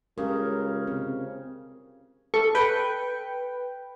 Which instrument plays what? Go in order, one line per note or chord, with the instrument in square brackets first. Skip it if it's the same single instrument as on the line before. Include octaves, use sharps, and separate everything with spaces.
[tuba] C#2 [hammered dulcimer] C#3 [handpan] G4 A#4
[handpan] C4
[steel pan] A4 [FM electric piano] C#6
[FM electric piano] B4 G5